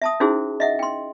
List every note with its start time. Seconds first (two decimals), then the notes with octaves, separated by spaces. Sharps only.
0.02 E5 A5 D#6
0.20 C#4 D#4 E4 F#4 G#4 C5
0.60 D#5 E5 F#5
0.79 G5 C6